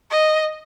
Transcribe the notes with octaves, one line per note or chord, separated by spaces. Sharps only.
D#5